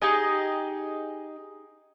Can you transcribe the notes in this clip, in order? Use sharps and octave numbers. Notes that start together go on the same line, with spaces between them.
D#4 G4 G#4 D#5